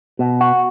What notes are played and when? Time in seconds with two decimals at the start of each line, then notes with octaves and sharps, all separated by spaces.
0.19 B2
0.41 F#4